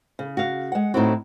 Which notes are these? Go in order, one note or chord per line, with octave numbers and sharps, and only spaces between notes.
C#3
F#4 F5
G#3 F#5
A2 C4 D#4 E4 F#4